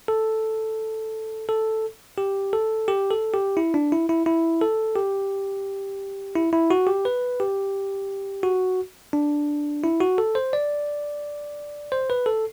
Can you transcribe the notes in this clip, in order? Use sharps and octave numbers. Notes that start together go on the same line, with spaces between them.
A4
A4
G4
A4
G4
A4
G4
E4
D4
E4
E4
E4
A4
G4
E4
E4
F#4
G4
B4
G4
F#4
D4
E4
F#4
A4
C5
D5
C5
B4
A4